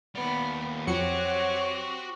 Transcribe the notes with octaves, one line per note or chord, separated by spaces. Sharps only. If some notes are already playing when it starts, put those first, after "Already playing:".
D#2 G3 B3
F2 F#3 C4 F#4 G4 C#5 C#7